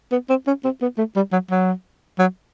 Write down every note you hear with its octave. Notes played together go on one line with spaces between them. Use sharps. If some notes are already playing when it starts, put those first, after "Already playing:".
B3
C4
C#4
C4
B3
A3
G3
F#3
F#3
F#3